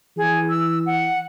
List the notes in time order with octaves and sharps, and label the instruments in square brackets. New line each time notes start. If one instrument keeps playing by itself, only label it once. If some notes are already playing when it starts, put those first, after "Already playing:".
[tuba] E3 [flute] G#4
[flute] E6
F#5